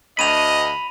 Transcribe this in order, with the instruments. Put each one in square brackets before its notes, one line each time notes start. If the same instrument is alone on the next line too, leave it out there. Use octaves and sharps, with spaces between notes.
[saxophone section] D2 [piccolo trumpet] D#5 [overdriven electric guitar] B5 [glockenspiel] D#7 F7